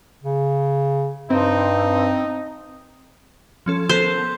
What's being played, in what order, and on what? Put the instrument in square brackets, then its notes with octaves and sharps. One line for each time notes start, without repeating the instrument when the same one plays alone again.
[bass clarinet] C#3
[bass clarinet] G2 [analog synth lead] C4 [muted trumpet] D#4
[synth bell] F3 C#4 A4
[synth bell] B3 A4 A#4 [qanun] C5